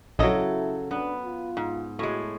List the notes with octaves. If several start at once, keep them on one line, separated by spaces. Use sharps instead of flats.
A#1 C#3 F#3 E4 A4 D#5
B3 D4 B4
F4
G#2
A2 G#3 F#4